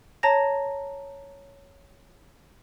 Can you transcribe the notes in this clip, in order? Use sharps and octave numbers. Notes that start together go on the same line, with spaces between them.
C#5 A5 A#5 A#6